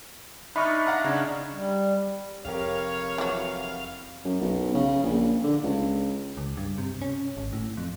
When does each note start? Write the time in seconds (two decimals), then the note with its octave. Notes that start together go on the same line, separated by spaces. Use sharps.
0.56 D4 D#4 E5 B5 C#6 F6
0.87 F5 F#5 A#5
1.04 C#3 C#4 D4
1.55 G3
2.45 F1 G4 A#4 C#5 F5
3.18 E3 F#3
4.25 F#2
4.41 B1
4.74 C#3
5.03 A#1
5.43 D3
5.63 C#2
6.37 C#2
6.57 G2
6.78 C3
7.02 C#4
7.37 G#1
7.53 A2
7.77 F2